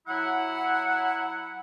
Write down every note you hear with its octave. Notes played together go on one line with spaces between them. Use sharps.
F#3 E4 F#5